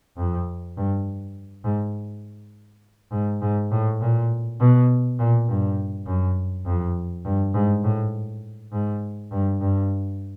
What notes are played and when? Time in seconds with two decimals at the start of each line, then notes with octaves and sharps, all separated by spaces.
0.17 F2
0.77 G2
1.64 G#2
3.12 G#2
3.42 G#2
3.72 A2
4.01 A#2
4.60 B2
5.19 A#2
5.48 G2
6.07 F#2
6.66 F2
7.25 G2
7.54 G#2
7.84 A2
8.72 G#2
9.32 G2
9.61 G2